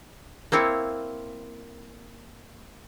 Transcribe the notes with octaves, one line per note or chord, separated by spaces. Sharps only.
A#3 C4 E4 C#5